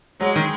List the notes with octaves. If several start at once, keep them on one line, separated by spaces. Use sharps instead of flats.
F#3 G#3
D#3